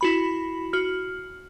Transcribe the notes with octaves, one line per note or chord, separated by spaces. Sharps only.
E4 F#4 B5
F#4 F6